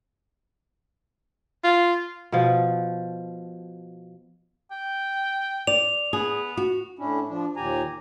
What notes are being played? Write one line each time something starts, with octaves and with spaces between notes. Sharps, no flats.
F4
B2 F3
G5
D5 F7
B3 G#4
F#4
A2 C#4 D4 E4
F3 D4
D#2 A#2 G4 G#5 A#5